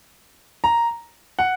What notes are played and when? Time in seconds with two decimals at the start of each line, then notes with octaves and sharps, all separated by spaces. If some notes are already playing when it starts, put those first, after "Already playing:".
0.64 A#5
1.39 F#5